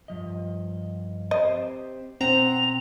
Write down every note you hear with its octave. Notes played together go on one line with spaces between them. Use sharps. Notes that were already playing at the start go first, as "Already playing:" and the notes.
G2 F3 D#5
C4 G4 C5 D#5
B2 C4 C5 F#5 A#5 F7